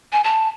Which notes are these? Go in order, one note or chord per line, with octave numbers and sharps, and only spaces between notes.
G#5
A5